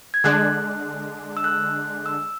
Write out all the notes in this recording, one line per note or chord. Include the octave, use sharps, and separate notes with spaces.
G#6
D3 G#3 D4 F#6
E6
F#6
E6